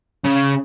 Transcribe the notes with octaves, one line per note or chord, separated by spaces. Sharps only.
C#3